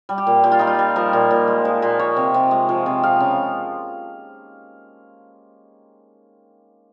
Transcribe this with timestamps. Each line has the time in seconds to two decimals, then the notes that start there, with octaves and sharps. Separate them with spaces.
0.09 G3
0.18 G4
0.27 A#2
0.44 A#2 G4
0.52 F4
0.59 G3 D#4
0.67 F4
0.79 G3
0.96 F3 A#4
1.13 A#2
1.31 A#2
1.48 G#3
1.65 F3
1.82 A#2
1.99 F3 C#5
2.17 C3
2.34 C3
2.51 G#3
2.69 F3
2.86 C3
3.03 F3 F5
3.20 C#3